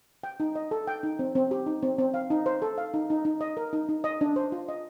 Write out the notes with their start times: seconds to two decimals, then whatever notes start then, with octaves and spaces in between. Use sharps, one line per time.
0.24 G5
0.40 D#4
0.55 D#5
0.71 A4
0.88 G5
1.03 D#4
1.19 C4
1.35 C4
1.51 G4
1.66 D#4
1.83 C4
1.98 C4
2.14 F5
2.30 D#4
2.46 C5
2.62 A4
2.78 F5
2.94 D#4
3.10 D#4
3.25 D#4
3.41 D#5
3.57 A#4
3.73 D#4
3.89 D#4
4.04 D#5
4.21 D4
4.36 C5
4.52 F4
4.69 D#5